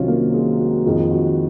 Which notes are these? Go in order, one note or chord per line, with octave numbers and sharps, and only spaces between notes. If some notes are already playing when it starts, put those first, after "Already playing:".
Already playing: C2 C3 D#3 F#3 C#4 F4 C#5
A#3 A#4
G#3 G#4
F#4
F2 D#3 G#3 F4
F#4